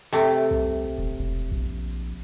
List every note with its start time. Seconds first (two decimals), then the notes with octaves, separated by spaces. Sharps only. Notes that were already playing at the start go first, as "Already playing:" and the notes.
0.13 C3 A3
0.51 C2
0.98 D#1
1.20 E1
1.52 A#1